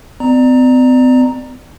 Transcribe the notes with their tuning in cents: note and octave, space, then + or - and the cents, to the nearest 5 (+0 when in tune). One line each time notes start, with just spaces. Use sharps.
C4 -45 D5 +20 A#5 +0